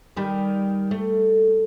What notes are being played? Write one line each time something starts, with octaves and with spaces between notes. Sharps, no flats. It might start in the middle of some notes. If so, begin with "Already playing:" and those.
D#3 G3
A3